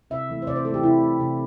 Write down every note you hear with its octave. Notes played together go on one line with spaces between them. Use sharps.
C3 E5
E3 A3
C5
C3 D5
C5
E3 A3 A4
G4
C3 E4
A3
C3